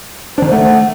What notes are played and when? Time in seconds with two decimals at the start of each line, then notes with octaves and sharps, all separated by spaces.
0.38 D#3 D4 C5
0.52 A3 F#5